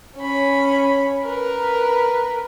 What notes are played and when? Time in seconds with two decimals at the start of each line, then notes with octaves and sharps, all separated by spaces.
0.17 C#4 B5
1.23 A#4 B4